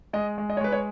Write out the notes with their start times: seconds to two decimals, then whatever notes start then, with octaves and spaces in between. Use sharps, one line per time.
0.13 G#3 D#5
0.38 G#3
0.50 D#5
0.57 C#5
0.61 G#3 B4
0.72 C#5